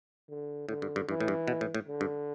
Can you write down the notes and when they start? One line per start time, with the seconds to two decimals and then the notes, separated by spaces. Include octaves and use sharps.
0.30 D3
0.69 A2 D3
0.82 G2
0.96 G2
1.09 G2 E3
1.21 A2
1.28 G2
1.48 B2
1.61 A2
1.75 A2
1.88 D3
2.01 G2